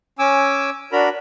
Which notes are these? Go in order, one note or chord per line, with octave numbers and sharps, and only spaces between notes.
C#4 G#5 D6 E6
D4 F#4 A#4 A#5 B5